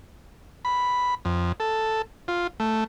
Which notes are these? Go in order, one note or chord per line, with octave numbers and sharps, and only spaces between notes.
B5
F2
A4
F4
A3